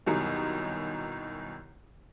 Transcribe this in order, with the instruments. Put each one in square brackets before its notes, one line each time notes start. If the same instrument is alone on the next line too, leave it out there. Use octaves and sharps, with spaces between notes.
[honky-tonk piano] C2 F#2 B2 D#3